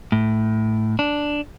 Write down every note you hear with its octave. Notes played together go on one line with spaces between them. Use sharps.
A2
D4